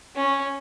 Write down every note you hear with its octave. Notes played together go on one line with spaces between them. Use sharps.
C#4